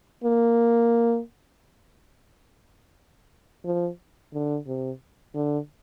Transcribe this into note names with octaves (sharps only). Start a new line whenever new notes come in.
A#3
F3
D3
C3
D3